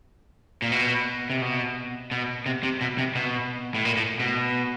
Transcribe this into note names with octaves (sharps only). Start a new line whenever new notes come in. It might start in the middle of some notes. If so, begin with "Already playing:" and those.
A#2
B2
C3
B2
B2
C3
C3
B2
C3
B2
A2
A#2
A2
B2